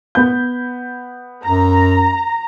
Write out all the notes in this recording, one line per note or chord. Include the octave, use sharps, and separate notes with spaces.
B3 B5 G6
F#2 A#5